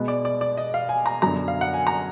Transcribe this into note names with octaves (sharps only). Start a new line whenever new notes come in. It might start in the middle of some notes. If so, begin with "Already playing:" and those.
Already playing: B2 G#3 B3
D5
D5
D5
D#5
F5
G#5
A#5
F#2 D3 F#3 B3 A#5
F5
F#5
G#5
A#5